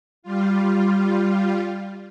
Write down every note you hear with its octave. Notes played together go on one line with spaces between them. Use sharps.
G3 F4